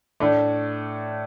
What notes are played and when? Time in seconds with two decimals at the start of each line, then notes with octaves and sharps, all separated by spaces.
0.20 A2 A3 D4